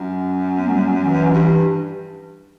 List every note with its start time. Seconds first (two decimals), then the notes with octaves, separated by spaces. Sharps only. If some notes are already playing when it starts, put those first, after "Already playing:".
Already playing: F#2
0.58 B3
0.66 A#3
0.73 G3
1.03 E3
1.33 G2